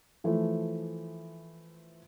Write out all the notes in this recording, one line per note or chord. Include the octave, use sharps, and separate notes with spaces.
E3 F3 A3